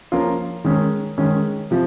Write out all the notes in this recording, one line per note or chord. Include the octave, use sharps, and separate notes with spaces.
F3 A#3 C#4 F4 A#4
D#3 G#3 C#4
D#3 G#3 C#4
C3 F3